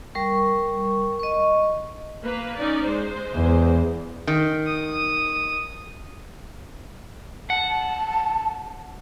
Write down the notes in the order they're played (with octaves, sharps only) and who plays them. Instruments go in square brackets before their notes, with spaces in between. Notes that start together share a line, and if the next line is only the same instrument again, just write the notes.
[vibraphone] G3 A#4 C#6
D#5 C#6
[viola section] A#3 B4
C#4 D#4 D5
G#3 C5
[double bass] E2
[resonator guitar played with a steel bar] D#3
[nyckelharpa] D#6
[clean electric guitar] F#5 [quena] A5